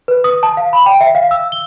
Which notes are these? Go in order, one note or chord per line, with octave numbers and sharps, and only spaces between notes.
B4
D#6
A5
F5
B5
G5
E5
F5
E6
G7